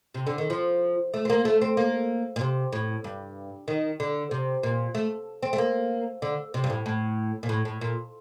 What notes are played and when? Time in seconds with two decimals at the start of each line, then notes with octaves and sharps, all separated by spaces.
0.14 C3
0.27 D3
0.38 D#3
0.50 F3
1.14 A3
1.25 C4
1.30 A#3
1.45 A3
1.62 C4
1.77 A#3
2.36 A#2
2.41 C3
2.72 A2
3.04 G2
3.68 D#3
4.00 D3
4.31 C3
4.63 A#2
4.95 A3
5.43 C4
5.53 A3
5.58 A#3
6.22 D3
6.54 C3
6.64 G2
6.70 A2
6.86 A2
7.43 A#2
7.49 A2
7.65 A2
7.81 A#2